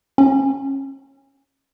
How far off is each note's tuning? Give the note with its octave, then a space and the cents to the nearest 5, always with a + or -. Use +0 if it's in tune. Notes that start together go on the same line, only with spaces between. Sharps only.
C#4 -25